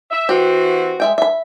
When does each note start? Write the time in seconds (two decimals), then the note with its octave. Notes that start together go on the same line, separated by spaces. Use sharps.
0.11 E5
0.29 E3 C4 F#4 G4
1.00 G#3 E5 G5
1.18 E5 B5